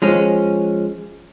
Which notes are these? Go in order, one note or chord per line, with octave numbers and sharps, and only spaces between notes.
F3 G#3 C#4